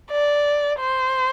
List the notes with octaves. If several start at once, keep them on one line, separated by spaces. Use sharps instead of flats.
D5
C5